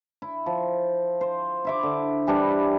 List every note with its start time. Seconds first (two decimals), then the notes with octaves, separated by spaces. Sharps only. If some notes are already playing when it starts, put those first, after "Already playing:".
0.22 E4
0.46 F3
1.21 C5
1.65 E4 E5 D6
1.83 D3
2.27 E3 G3 D4 E4